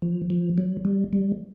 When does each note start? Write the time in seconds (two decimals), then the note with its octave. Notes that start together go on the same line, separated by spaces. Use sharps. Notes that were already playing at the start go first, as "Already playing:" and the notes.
0.02 F3
0.30 F3
0.58 F#3
0.85 G3
1.13 G3